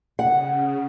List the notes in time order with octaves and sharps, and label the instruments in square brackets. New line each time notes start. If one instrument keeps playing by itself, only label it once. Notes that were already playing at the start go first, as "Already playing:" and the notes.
[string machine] C#3 [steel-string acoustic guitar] F#5